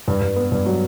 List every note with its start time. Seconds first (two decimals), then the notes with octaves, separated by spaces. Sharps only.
0.08 G2
0.22 G2
0.36 B3
0.52 G2
0.66 F#3